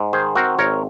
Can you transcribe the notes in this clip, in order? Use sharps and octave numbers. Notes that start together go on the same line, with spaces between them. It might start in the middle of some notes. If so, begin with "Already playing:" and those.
Already playing: G#2
D#3 G#4 C5
C4 F#4 A#4
G#1 A#4 C#5